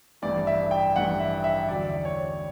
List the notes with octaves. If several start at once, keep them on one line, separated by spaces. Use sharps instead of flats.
A1 G2 E3 D5
E5
G5
A1 G2 E3 F#5
E5
E5
E2 D3 F#3 D5
C#5